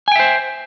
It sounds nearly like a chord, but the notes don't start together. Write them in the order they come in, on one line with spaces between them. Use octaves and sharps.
G#5 G5 E5 C5